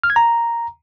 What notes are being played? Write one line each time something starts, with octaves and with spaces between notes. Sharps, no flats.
F6
G#6
A#5